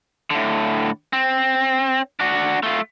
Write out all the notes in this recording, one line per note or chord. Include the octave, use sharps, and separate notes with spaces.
A2 D3
C4
D4 F#4
A3 F4